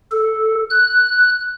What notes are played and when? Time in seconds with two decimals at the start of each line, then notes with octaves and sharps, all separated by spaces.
0.12 A4
0.70 F#6